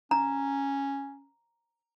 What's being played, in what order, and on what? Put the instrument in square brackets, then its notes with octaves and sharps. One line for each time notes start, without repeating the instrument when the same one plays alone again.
[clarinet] C#4 [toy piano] A#5